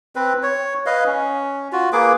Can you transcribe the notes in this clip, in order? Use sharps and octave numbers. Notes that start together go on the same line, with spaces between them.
C4 B4
C#5
B4 D#5 F5
C#4
F4 F#4
A#3 G#4 B4 D6